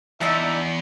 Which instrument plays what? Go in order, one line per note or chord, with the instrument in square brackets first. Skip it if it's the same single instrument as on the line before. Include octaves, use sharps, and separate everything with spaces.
[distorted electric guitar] E2 [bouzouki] D4 D#4 [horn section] E5